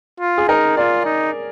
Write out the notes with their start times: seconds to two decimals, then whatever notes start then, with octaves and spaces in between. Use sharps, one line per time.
0.21 F4
0.38 G#4
0.48 D#4 A#4
0.77 F4 D5
1.05 D#4